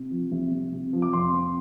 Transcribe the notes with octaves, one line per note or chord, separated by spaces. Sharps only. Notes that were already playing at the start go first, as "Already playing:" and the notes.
Already playing: C3
F3
C2
C2
C3
F3
D6
F2 C6
C4